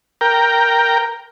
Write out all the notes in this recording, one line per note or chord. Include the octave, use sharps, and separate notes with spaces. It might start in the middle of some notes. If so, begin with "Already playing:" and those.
A#4 G5